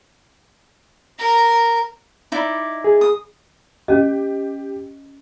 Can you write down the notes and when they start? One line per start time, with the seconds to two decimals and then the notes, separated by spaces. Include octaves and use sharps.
1.18 A#4 A#5
2.32 D#4 E4 D5
2.84 G#4
3.01 D#6
3.88 C#4 G4 D#5